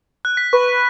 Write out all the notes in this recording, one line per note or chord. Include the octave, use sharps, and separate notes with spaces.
F#6
B6
B4 C#6